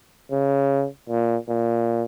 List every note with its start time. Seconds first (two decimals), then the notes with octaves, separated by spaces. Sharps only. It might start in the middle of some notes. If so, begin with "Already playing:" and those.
0.32 C#3
1.09 A#2
1.49 A#2